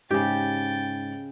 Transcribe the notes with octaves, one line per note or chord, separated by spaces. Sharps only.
G#2 C#3 G4 G5 A6